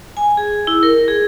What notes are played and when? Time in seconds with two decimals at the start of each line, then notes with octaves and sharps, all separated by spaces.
0.17 G#5
0.37 G#4
0.67 E4
0.83 A#4
1.08 G#4